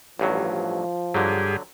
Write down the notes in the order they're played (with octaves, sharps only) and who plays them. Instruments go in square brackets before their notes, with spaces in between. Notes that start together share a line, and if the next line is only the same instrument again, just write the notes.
[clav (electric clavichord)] A1 G2 F#3 [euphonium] F3
[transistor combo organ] G2 G4 G#4 [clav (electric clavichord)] D3 F#3